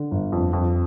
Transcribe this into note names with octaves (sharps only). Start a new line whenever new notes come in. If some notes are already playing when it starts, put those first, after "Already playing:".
Already playing: D3
G1
F2
F2